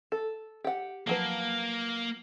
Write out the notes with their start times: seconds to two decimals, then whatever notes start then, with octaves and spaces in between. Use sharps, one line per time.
0.12 A4
0.64 G4 F#5
1.07 F3 F#3 A#3 B4